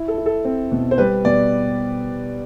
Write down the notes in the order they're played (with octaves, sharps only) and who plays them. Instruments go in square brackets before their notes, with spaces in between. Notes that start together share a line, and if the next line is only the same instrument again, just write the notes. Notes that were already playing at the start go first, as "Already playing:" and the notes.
Already playing: [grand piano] E4
A4
E4
A4
C4
B2
C5
G3 B4
B2 D5